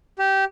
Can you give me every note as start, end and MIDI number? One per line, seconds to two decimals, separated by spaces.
0.19 0.45 67